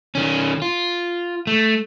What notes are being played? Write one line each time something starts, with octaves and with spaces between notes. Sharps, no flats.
D#3 C#4
F4
A3